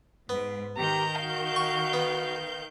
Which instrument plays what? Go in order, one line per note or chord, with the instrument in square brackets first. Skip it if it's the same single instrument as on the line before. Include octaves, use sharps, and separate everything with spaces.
[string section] G#2 [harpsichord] B3
[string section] D#3 G6 [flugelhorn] G4 [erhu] A#5
[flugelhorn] F#4 [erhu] F5
[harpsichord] C#6
B3